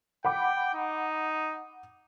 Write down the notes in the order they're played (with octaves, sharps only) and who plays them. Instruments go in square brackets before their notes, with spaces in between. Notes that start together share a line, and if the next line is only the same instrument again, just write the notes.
[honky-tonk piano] F#5 B5 D6 [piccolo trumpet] G5
[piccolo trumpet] D#4